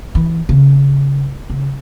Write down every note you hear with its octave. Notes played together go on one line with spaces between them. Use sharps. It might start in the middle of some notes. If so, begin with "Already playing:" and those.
E3
C#3
C#3